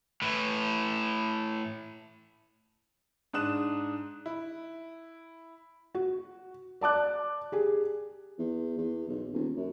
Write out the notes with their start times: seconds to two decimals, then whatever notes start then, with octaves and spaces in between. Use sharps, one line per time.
0.22 A2 E3
3.34 G#2 D4 D#6 F#6 E7
4.26 E4
5.95 F#4
6.81 D5 A5 D6 F#6
7.52 G4 G#4
8.39 E2
8.78 E2
9.09 B1
9.33 D#1
9.56 F#2